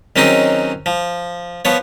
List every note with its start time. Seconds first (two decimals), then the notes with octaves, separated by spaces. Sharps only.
0.16 D#3 F#3 C4 C#4 D#4 G#4
0.86 F3
1.65 F3 B3 C#5